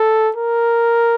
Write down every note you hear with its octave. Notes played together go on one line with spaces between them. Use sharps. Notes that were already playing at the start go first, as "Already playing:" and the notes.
Already playing: A4
A#4